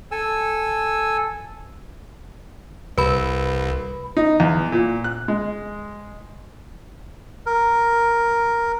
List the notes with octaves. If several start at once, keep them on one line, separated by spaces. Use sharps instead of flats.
A4 G#5 E6
C2 B4 B5
D#4
E2
A#2
F#6
G#3
A#4